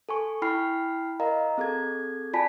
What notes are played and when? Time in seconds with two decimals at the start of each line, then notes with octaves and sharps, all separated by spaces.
0.09 A4 G#5 C#6
0.42 E4 G5 B5 F6 C7
1.20 A#4 D#5 F5 A#5
1.58 C4 G#4 A4 G#6
2.34 F4 D5 G#5 A5 B5 B6